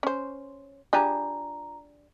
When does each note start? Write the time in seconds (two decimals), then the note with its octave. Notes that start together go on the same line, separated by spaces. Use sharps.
0.03 C#4 C5
0.93 D4 F4 G4 G#4 A#5